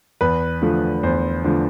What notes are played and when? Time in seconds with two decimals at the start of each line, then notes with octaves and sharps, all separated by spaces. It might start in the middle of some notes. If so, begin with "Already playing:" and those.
0.21 E2 B4
0.61 D3 F3 A3
1.03 E2 C5
1.44 D3 F3 A3